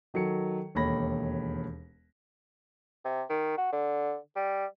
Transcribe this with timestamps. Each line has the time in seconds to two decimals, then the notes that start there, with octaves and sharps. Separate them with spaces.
0.14 D#3 F#3 A4 C#7
0.75 E1 D#2 A4 C#5 B5 A#6
3.05 C3
3.30 D#3
3.58 F#4
3.72 D3
4.36 G3